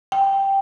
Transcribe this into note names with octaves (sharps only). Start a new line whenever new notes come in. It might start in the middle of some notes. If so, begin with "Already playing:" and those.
G5